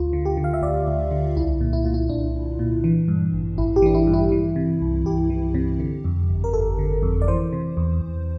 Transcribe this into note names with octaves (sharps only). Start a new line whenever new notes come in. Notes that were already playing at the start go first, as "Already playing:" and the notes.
Already playing: D2 F4
D3
G4
D3
F5
E5
D2 D5
D2
D3
C2 E4
A#2
E4
A#2 F4
E4
C2 D4
C2
A#2
E3
G2
A1
A1 E4
G4
E3 D4
E4
G2
E4
E3
C3
C2
C2 G4
E3
C3
D3
F2
G1
A#4
G1 A4
D3
F2
D5
E3 C5
C3
E2
E2